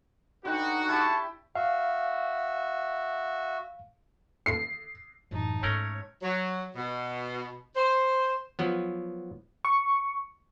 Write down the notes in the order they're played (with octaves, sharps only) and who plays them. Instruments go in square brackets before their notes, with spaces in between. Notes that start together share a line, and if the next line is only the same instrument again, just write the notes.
[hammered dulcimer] D3 G5 [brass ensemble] D#4 F#4 [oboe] B4
[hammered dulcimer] E4 G4 [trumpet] A5 [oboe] C#6
[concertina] F#4 E5 [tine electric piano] F5
[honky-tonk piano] C7
[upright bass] A1 F#2 [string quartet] D#4 A5
[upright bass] G#2 [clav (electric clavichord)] A3 C#4 A#4 [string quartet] C#5
[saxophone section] F#3
B2
C5
[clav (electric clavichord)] F3 F#3 B3
[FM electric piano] C#6